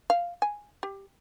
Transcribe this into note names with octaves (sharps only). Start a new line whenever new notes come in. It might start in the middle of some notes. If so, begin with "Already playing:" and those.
F5
G#5
G4